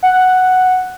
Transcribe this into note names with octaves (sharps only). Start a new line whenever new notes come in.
F#5